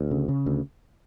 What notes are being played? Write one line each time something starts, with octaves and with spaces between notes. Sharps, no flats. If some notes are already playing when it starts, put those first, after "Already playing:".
Already playing: D2
C#3
C#3
D2